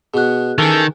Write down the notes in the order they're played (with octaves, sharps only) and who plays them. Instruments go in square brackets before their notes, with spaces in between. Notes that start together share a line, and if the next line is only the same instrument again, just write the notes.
[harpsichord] B2 B3 [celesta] G#4 F#6
[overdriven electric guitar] D#3 [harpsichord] E3 C#4 [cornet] A4